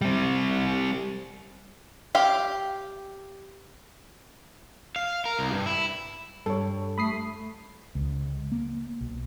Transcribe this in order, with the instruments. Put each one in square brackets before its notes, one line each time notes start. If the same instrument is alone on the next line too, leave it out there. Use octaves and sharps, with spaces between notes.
[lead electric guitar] G3 C4
[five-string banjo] G4 F5 G5
[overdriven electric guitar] F5
A#4
C2
G2
E4
[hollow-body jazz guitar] G2 [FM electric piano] A4 C#5
[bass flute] A3 [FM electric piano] B5 D#6 C7
[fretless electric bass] C#2
A#3
B1